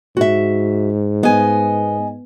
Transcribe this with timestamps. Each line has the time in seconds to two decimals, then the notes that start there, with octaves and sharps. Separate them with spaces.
0.17 G#2 F#4 E5
1.23 B3 D#5 G#5